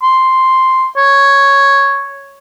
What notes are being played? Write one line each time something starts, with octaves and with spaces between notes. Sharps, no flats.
C6
C#5